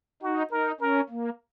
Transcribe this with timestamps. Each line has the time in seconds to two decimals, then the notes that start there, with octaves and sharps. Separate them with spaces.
0.22 D#4 F#4
0.51 D#4 A#4
0.80 C#4 A#4
1.09 A#3